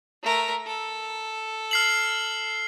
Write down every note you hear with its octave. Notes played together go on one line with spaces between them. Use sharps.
A3 A#4
A4
F6 C7 F#7